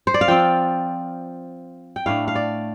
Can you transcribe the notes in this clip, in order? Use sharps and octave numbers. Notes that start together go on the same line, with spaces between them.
C5
D5
F5
F3 C4 G5
G5
A2 A3 D4 F5
F5
D5